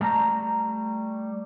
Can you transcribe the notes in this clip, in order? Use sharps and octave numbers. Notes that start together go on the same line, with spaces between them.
G3 A3 A5 A#5